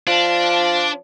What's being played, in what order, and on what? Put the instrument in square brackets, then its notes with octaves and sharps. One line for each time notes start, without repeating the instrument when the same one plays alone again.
[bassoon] F3 [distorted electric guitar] D4